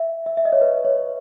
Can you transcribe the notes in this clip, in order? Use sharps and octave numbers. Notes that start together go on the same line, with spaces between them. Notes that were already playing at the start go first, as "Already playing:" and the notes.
Already playing: E5
E5
E5
D#5
C#5
B4
C#5